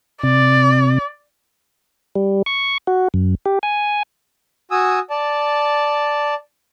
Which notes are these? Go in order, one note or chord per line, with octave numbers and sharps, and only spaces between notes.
C3 D5
G3
C#6
F#4
F#2
G4
G#5
F#4 G#5 D#6 E6
D5 A5